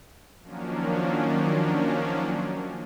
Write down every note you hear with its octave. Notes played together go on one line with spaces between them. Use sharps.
D#3 F3 F#3 A#3 C#4 D4